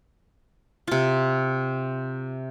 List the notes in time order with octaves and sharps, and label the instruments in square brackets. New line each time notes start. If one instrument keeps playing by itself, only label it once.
[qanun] C3 F4